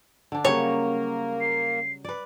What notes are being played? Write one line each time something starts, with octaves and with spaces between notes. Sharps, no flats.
D3 D4
C#3 F#3 G3 A#3 C#5
C7
B4 D5